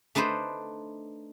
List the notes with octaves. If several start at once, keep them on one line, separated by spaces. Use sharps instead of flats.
A3 D4 D#4 B4 C5